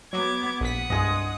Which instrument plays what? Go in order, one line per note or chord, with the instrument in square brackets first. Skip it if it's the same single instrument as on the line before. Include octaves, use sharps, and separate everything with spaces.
[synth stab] F#3 [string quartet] B3 D6 G#6
[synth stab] A#1 B6 [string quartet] F#5 D#6
[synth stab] C2 G2 [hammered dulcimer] G#3 G#4 D#5